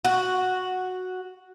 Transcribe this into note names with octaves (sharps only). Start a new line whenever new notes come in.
F#4